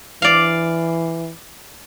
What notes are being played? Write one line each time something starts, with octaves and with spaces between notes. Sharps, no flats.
E3 D5 F5